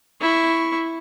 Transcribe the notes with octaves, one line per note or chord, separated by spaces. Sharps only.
E4 C#6